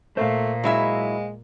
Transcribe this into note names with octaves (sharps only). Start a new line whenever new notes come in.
A#2 A3 C5 F5
F#3 G#3 E4 E5